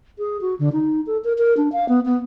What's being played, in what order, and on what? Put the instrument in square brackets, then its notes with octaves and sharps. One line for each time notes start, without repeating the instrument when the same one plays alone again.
[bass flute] G#4
F#4
D3
D#4
A4
A#4
A#4
D4
F5
B3
B3